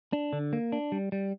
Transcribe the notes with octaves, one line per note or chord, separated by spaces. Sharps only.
D4
D3
A#3
D4
G3
G3